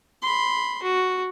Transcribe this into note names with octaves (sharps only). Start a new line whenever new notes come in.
B5 C6
F#4